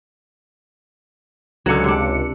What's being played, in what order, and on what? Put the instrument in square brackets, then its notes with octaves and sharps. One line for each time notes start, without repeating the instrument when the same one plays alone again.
[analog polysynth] C#2 C#7 [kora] D3 F#3
[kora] C3 D4